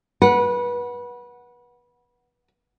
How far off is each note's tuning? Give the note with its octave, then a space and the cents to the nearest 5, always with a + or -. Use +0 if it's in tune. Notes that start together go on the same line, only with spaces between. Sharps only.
B4 -25 F#5 +0